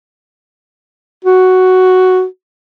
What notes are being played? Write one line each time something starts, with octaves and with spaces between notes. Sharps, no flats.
F#4